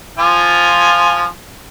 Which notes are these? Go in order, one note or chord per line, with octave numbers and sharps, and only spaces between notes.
F3 F4 G#5